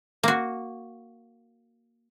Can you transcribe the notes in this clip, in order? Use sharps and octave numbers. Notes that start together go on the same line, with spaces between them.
A#3 F#4